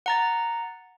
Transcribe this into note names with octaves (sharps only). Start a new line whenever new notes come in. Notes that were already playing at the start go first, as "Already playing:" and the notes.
F#5 A#5 A6